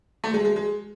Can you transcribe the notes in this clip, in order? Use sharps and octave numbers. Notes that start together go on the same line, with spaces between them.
A3
G#3
G#3
G#3